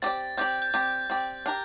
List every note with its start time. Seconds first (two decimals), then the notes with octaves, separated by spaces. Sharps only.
0.02 C4 G4 D5 A6
0.37 C4 G4 D5 G6
0.62 G6
0.74 C4 G4 D5 G6
1.10 C4 G4 D5
1.46 D4 G4 A#4